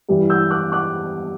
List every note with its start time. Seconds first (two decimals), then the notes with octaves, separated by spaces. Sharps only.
0.09 G2 E3 G3
0.30 E6 G6
0.50 D6 F#6
0.72 D6 F#6